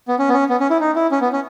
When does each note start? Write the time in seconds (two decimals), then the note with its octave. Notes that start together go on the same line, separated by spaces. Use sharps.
0.08 B3
0.19 C#4
0.29 B3
0.33 C#4
0.49 B3
0.60 C#4
0.70 E4
0.80 D#4
0.96 E4
1.11 C#4
1.21 B3
1.33 C#4